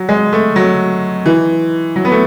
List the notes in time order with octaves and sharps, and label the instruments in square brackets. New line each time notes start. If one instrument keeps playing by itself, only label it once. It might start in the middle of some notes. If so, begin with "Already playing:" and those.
Already playing: [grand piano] F#3
G#3
A3
F#3
E3
F#3
B3
A3